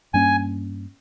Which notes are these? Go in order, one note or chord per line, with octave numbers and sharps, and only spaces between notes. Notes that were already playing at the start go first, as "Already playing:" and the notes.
G2 G3 A#3 C#4 G#5